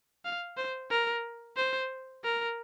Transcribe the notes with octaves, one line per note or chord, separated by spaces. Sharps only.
F5
C5
A#4
C5
A#4